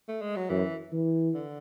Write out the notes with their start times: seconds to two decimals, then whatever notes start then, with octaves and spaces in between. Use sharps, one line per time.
0.08 A3
0.22 G#3
0.36 F#3
0.50 F#2 E3
0.92 E3
1.34 D3